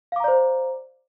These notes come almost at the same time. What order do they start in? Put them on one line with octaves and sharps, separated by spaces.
F5 D6 A#5 D5 C5